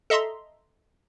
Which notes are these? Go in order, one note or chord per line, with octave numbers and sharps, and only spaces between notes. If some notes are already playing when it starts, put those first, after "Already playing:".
A4 D#5 E5 A#5 C6